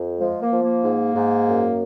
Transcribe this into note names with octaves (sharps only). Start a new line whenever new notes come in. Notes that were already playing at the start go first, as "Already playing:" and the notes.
Already playing: F2
F3 G#3
A#3
F3
A#3
G#2
G#2
F#2